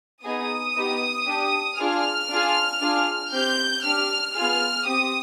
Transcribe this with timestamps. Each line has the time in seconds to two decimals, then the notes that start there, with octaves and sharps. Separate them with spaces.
0.24 B3 D#4 G#4 D#6
0.75 B3 D#4 G4
1.27 D4 G4
1.78 D4 F4 G#4 F6
2.29 D4 F4 G#4
2.81 D4 F4 G#4
3.32 C4 G4 G6
3.84 D4 G4 F6
4.35 B3 F4 G#4 F6
4.86 C4 G4 D#6